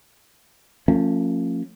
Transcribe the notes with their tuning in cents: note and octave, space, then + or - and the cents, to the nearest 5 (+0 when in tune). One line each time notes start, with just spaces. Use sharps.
F3 +0 A3 +40 C#4 -15